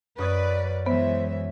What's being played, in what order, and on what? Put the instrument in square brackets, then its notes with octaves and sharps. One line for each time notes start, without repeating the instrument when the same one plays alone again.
[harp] F#2 D#6 [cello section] B4 D5
[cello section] E3 G#3 E5 [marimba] B3 [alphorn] C5